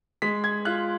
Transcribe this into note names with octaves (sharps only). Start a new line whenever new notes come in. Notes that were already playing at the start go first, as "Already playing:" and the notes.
G#3 B6
G#6
F4 F#6